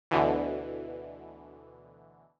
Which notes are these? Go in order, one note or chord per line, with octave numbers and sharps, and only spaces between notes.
D2 B2 D3 E3